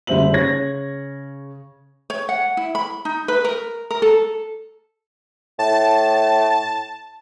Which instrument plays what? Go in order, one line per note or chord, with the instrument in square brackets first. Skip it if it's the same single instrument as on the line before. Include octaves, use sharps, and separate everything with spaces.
[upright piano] F#1 D3 G3 C5 E5 F#7
C#3 C#5 G#6 A#6
[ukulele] C#5
F#5
E4
B5
D#4
B4
A#4
A#4
A4
[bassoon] A2 [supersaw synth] A5